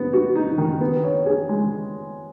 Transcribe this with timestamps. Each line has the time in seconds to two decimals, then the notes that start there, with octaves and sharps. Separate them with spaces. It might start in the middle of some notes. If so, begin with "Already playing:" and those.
Already playing: B3
0.13 F#4
0.35 D#4
0.58 D#3
0.80 B3
1.04 C#5
1.26 G#4
1.49 G#3